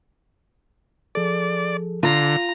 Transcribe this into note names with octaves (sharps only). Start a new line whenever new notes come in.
F3 G#4 A4 D5
D3 F4 A#5